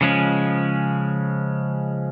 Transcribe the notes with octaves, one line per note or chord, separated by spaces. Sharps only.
C#3 F3 G#3 C#4